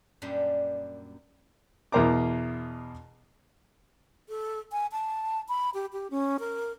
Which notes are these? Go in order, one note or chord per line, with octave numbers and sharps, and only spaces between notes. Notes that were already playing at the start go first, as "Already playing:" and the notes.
F#2 A#2 G3 D4
E2 B2 A#4 C5 A#5 D6
A4
G#5
A5
B5
G4
G4
C#4
A#4